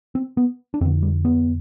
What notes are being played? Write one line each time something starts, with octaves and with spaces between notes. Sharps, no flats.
C4
B3
D4
F2 D3 C4
G3
B3